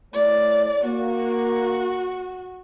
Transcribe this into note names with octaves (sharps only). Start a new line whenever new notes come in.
A3 E4 C#5 D5
A#3 F#4